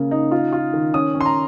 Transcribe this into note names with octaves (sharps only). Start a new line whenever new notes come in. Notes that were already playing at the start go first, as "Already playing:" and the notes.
Already playing: C#3 A#3
D#4
F4
F4
D#3
C#4 D#6
C#4
C6
A#5